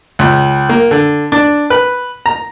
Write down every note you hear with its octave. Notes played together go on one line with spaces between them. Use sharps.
C#2
A#3
D3
D4
B4
A#5